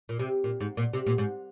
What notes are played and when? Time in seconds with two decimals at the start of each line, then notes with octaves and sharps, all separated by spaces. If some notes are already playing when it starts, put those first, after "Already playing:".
0.09 A#2
0.20 C3
0.44 A#2
0.60 G#2
0.77 A#2
0.93 C3
1.06 A#2
1.18 G#2